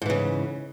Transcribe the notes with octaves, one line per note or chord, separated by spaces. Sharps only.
G#2 C#3 E3